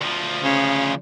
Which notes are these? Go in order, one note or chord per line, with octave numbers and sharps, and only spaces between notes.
D2 F3
C#3